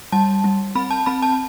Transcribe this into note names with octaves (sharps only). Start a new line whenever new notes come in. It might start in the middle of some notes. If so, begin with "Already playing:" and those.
G3 A5
G3
C4 B5
A5
C4 B5
A5